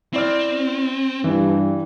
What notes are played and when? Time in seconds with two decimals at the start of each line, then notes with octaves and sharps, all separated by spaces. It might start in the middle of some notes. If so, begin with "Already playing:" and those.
0.13 C4 E4 D5 F6
1.24 G2 E3